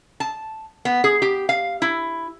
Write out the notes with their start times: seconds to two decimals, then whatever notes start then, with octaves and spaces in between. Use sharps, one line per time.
0.20 A5
0.85 B3
1.04 G#4
1.22 G4
1.49 F5
1.82 E4